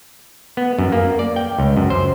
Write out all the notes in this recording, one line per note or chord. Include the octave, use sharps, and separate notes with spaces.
B3
F#2
A#3
D5
G5
C#2
F#2
C5